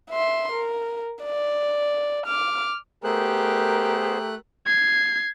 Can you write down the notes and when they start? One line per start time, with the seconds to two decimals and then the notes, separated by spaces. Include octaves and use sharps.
0.11 E5 C6
0.52 A#4
1.24 D5
2.26 D6 F6
3.04 A3 B3 G4 G#4 A#4 C5 F#6
4.66 G#6 C7